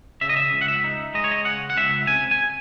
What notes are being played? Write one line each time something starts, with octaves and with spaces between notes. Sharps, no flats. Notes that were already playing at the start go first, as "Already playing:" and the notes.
C#3 E5
D#5
E5
C#2
F#5
E5
D#4
G#3 D#5
C#5
D#5
C#3 F#5
F#5
C#2 E5
C3 G#5
G#5